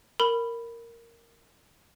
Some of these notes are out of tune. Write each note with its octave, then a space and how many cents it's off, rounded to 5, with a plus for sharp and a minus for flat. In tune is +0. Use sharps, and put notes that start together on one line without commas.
A#4 -5 B5 +0